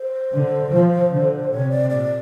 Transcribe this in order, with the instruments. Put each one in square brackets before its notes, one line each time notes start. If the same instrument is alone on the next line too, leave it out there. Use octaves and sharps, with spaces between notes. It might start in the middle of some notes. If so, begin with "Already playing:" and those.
Already playing: [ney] C5
[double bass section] D3
F3
D3
[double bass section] C3 [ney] C#5
[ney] D5
[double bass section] A#2 [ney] D5